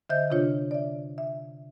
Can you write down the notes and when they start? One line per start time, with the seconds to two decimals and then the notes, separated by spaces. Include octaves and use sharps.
0.09 D3 C5 D#5 E5 G6
0.30 C3 D4 F4 C#5
0.71 D5 E5
1.18 E5